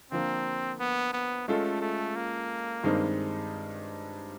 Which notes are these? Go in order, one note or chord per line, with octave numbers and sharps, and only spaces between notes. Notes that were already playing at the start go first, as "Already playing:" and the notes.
D3 F3 A#3 C4
B3
B3
G#3 A3 C#4 F4 A4
A3
A#3
G2 D#3 G#3 C4 D#4